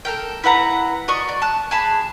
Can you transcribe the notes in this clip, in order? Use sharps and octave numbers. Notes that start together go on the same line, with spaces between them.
A4 A#4 G5
E4 B4 F#5 A#5
F#4 D5 D#5 C#6
D5
A5 F#6
G#4 A5 B5